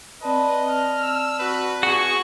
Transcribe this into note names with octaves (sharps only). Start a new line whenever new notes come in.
C4 B4 D5 D#5 A5
F6
E6
F#4 B4
F#4 G#4 C#6